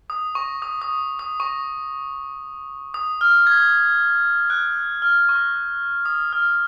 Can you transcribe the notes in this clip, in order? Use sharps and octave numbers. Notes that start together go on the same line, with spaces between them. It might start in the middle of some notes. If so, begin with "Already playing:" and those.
D#6
C#6
D#6
D#6
D#6
C#6
D#6
F6
G#6
F#6
F6
C#6
D#6
F6